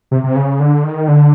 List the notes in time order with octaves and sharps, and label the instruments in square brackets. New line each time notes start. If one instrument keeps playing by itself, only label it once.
[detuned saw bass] C3
C3
C#3
D3
D#3
D3